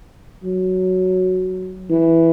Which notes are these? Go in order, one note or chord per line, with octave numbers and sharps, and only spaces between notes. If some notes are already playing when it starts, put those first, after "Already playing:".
F#3
E3